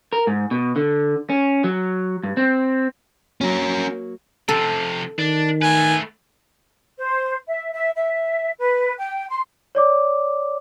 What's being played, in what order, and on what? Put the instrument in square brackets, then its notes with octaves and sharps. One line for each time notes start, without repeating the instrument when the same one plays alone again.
[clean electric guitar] A#4
G#2
B2
D3
C#4
F#3
G2
C4
[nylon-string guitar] F#3 A#3 [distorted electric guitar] C#4 A#4
[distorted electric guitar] C3 F3 [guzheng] A4
[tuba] D#3 [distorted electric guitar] D4
[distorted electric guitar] A3 B4 [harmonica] G#5
[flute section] C5
E5
E5
E5
B4
G5
C6
[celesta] C#5 D5 D6